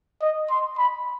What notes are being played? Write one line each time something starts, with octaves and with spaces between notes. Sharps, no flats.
D#5
C6
B5